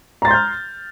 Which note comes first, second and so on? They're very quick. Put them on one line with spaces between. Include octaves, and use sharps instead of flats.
A#5 A6 C6 G6 F6